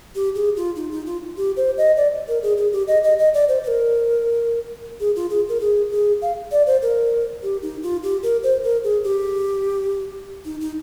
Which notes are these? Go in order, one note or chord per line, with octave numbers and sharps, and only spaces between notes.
G4
G#4
F4
D#4
D#4
F4
G4
C5
D#5
D5
A#4
G#4
G#4
G4
D#5
D#5
D#5
D5
C5
C5
A#4
G#4
F4
G#4
A#4
G#4
G#4
F5
D5
C5
A#4
G4
D#4
F4
G4
A#4
C5
A#4
G#4
G4
D#4
D#4